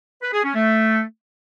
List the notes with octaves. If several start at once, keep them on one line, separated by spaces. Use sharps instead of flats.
B4
G#4
C#4
A3